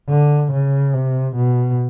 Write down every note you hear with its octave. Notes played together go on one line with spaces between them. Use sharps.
D3
C#3
C3
B2